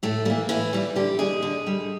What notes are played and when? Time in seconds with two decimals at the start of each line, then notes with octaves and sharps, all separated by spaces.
0.03 A2 A3
0.25 E3 G3 A#3
0.49 A2 E3 E4
0.73 E3 G3
0.96 D3 G3 G4
1.19 G3 G#3 G#4
1.43 D3
1.67 G3